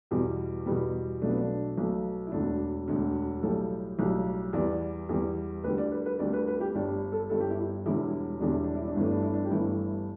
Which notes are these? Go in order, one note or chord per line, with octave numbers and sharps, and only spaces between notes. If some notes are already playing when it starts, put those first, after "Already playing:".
E2 B2 G3
E2 B2 G3 B3
B1 B2 A3 D4
B3
D4
B1 B2 A3
E4
E1 D2 D3 D4
E1 D2 D3
B1 A2 G3 A4
B1 A2 G3
E2 E3 G3 D5
E2 E3 G3
D2 D3 G3 B4
D5
B4
B4
D2 D3 G3 D5
B4
B4
G4
G1 G2 G3 D5
A4
G1 G2 G3 A4
G4
E4
G4
E1 E2 D3 G3 E4
E1 E2 D3 G3 D4
E4
D4
E4
D4
G1 G2 E3 A3 E4
D4
E4
D4
G4
G1 G2 E3 A3 E4